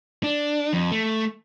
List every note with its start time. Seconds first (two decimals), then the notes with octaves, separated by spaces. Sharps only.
0.23 D4
0.73 F2
0.92 A3